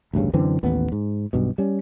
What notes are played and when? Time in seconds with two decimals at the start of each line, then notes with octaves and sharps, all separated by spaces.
0.13 A1 D2 G2 C#3
0.33 F#2 D3 E3 C4
0.63 A1 D#2 B3
0.92 G#2
1.33 B1 G2 B2
1.58 G3 C#4